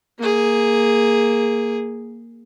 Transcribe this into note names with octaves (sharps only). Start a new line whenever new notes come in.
A#3 G#4